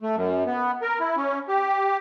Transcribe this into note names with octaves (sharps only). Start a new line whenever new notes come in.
A3
F#2
B3
A#4
E4
C#4
G4